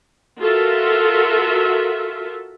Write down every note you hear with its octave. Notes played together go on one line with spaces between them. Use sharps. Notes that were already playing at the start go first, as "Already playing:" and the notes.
F4 F#4 A4 A#4 E5